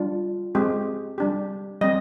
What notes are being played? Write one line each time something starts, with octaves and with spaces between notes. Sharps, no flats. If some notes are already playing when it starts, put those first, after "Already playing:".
Already playing: G3 D4 F4
G#3 C4 G4
G3 D4 G4
G3 C4 D#5